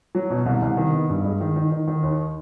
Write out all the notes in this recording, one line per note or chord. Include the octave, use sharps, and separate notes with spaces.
F#3
B2
C2
C2
D#3
B3
G2
G#3
D#3
D#3
D#3
D#3
D#2